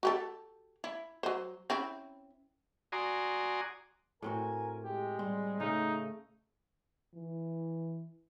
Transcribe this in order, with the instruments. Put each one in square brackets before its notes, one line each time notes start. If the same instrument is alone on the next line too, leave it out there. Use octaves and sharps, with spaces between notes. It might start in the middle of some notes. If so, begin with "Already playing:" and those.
[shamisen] F#4 G4 A4
E4
F#3 C5
C4 C#4 E4
[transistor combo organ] F#4 D5 G#5 A#5 C6 D#6
[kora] A2 C4 F#4 [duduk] A#4 [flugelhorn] G#5
[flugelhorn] G#3 [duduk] G4
[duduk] G3 [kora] C4
[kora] C#3 [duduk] A3 [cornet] D#4
[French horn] E3